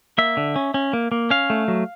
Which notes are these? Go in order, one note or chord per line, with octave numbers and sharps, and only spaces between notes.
A#3 E5
D3
C#4
C#4
A#3
A#3
C#4 F5
A3
F#3